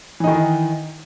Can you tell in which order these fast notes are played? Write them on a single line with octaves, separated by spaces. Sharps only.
E3 D#4 D#3